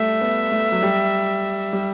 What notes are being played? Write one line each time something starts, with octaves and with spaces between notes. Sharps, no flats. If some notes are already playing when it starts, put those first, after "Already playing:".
Already playing: G3 A3 E5
B3
A3
F#3
G3
G3